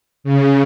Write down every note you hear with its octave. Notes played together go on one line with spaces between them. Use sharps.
C#3